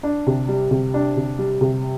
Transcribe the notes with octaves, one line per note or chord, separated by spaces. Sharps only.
D4
C3
G3
C3
D4
C3
G3
C3